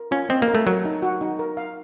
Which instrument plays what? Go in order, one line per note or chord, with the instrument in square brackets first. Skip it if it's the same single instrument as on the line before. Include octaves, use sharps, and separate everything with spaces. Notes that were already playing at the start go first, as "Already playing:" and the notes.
Already playing: [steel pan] A#4
[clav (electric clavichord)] C#4 [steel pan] F4
[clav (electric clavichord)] C4 [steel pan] D#5
[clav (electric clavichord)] A#3
[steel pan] A#4
[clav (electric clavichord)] A3
[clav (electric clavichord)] F#3 [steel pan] A#4
[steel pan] D#4
F#4
D#4
A#4
F5